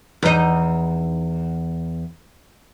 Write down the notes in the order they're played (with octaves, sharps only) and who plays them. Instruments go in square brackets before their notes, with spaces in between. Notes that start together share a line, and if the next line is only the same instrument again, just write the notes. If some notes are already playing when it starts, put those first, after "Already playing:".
[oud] E2 D#4